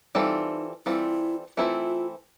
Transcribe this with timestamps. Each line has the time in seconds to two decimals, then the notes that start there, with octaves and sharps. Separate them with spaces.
0.15 E3 G3 C4 D#4 F4 A4
0.86 E3 G3 C4 E4 F4 A4
1.57 E3 A3 C4 E4 F4 A4